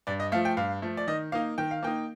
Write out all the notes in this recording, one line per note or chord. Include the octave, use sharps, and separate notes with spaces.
G2 D5
D#5
F3 A3 F5
G5
G2 F5
F3 A3
D5
D#3 D#5
A#3 D#4 F5
D#3 G5
F5
A#3 D#4 G5